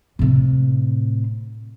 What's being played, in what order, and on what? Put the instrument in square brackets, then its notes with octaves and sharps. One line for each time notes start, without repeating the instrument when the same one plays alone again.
[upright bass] A2 C3